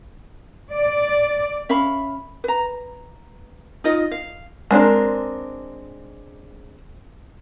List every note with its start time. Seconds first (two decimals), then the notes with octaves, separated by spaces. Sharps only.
0.72 D5
1.69 C#4 E5 F5 B5
2.44 B4 A#5
3.84 D#4 F4 D#5
4.11 F5
4.71 G#3 C4 D4 A#4